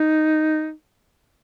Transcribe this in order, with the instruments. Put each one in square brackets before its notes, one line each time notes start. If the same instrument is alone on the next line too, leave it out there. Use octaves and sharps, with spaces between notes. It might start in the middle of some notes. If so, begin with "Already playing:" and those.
Already playing: [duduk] D#4